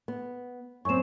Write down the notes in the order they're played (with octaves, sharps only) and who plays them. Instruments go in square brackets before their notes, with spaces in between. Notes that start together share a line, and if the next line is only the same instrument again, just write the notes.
[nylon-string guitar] B3
[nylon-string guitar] F#2 C4 [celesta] C#6 E7